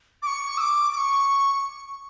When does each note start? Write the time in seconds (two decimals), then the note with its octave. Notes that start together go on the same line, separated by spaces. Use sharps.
0.22 D6
0.27 C#6
0.57 E6
0.61 D6
0.93 D6
0.97 C#6